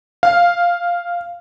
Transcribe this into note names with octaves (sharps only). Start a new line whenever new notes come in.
F5